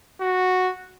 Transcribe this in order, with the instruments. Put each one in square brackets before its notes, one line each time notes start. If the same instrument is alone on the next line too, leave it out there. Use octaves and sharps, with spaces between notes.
[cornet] F#4